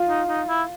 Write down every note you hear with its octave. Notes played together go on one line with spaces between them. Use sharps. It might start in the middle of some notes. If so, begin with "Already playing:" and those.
Already playing: F4
D#4
D#4
E4